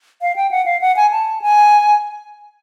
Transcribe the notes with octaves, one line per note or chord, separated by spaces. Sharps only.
F5
G5
F#5
F5
F#5
G#5
A5
G#5